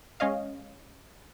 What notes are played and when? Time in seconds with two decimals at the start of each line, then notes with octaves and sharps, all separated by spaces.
0.20 G#3 C#4 C#5 D#5 F5